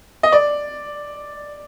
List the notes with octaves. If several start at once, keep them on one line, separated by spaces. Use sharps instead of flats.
D#5
D5